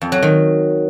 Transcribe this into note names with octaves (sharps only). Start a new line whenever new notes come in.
F2
F#3
D#3